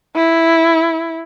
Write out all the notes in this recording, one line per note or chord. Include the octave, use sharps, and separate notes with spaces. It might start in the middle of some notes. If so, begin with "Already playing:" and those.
E4